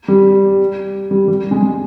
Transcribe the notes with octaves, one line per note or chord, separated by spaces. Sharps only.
G3
G3
G3
G#3
G#3